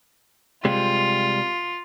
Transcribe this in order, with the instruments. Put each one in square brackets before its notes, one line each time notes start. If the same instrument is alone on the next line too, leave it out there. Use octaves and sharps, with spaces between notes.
[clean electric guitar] C3 G3 G#3 [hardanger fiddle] F4